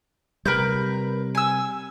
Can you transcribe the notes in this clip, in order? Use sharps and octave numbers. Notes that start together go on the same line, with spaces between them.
C3 G3 A#4 B4 G6
G#5 E6